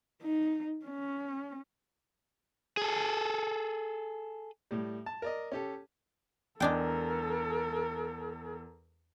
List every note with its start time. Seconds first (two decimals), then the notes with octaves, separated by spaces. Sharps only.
0.22 D#4
0.86 C#4
2.77 G#4 A4
4.71 A2 G3
5.06 A5
5.22 A#4 D5 D#5
5.52 C#4 G4 A4
6.60 E2 G#3 D4 A4 A#4 G5